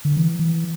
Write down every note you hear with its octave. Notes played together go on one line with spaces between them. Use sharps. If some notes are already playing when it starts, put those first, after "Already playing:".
D3
E3
E3